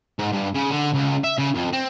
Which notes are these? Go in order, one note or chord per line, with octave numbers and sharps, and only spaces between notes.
G#2
G2
C#3
D3
C#2
E5
C#3
F2
C4